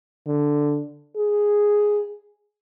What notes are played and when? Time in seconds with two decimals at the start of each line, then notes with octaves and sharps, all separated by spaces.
0.27 D3
1.17 G#4